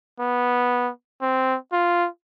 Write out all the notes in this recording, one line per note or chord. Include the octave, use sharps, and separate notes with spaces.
B3
C4
F4